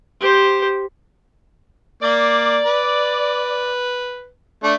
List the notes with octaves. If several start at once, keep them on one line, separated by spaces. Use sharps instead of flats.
G4 C5
A#3 D5
B4
A3 D4